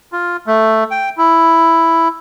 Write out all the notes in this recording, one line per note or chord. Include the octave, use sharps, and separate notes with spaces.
F4
A3
G5
E4